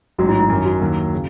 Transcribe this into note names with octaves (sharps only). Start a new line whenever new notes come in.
A1 G#2 F#3 F#4
E4
E4
F#2 D#3 F#3 E4
F#4
D#2 D#3 F#3
C#3